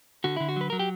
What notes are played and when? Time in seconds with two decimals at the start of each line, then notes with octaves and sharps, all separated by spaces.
0.24 D3 F#4
0.36 D3 E4
0.49 F#4
0.56 F#3 B4
0.70 F#3 A#4
0.79 G4